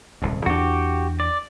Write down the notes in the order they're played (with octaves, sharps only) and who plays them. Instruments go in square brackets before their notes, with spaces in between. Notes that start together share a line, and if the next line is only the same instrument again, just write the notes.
[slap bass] D#1 C2 G#2
[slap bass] E2 C#4 D4 [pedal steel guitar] F#4 G4
[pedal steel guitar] D5